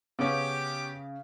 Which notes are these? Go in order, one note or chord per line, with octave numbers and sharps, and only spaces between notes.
C#3 B3 C#4 G4 D6